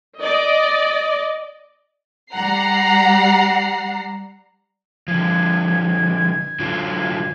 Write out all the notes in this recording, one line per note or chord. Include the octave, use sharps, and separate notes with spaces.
D5 D#5
G3 F#5 A#5 C7
D3 F3 G#6
D3 F#3 F4